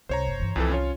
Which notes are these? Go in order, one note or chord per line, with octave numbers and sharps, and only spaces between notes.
C2 C5 C#5 A#5
F#1
G2 E3
C2 F2 E3 A4
C#4 F4 C#5